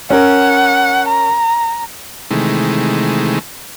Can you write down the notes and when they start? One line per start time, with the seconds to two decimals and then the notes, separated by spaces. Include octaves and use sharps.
0.10 C#4 A#4 F#5
1.08 A#5
2.31 C3 D#3 E3 G#3 A3